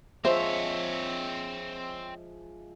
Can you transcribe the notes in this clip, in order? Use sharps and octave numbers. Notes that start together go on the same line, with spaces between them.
F3 G#3 C4 C5 C#5 E5